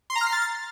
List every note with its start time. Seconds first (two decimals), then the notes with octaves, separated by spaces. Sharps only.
0.10 C6
0.15 A#5
0.21 F6
0.27 C7
0.32 A6